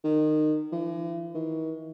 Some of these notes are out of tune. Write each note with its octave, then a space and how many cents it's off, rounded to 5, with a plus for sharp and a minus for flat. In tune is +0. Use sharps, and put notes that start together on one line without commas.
D#3 -20
E3 +45
D#3 +45